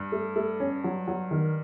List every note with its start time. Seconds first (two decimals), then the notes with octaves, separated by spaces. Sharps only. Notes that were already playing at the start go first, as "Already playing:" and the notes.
Already playing: G2
0.12 A3
0.36 A3
0.60 C#4
0.84 F#3
1.08 F#3
1.31 D#3